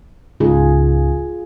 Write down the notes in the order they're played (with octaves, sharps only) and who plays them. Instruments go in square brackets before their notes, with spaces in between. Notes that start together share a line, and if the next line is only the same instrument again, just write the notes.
[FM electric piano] C#2 G#2 [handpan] F4 G#4